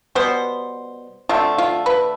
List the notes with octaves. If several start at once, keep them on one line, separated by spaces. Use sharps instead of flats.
B2 G3 B3 C5
D3 A3 C4 F4
F4
B4